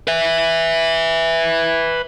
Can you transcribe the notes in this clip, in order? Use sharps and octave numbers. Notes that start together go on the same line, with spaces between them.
B4 E5